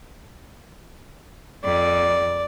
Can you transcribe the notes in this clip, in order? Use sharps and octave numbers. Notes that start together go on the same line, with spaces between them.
F2 D5